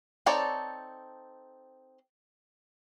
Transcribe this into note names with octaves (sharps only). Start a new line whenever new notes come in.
C4 D#4 A4 C#5 D5